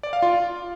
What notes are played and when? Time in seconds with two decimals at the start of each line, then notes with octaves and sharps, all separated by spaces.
0.03 D5
0.13 F5
0.22 F4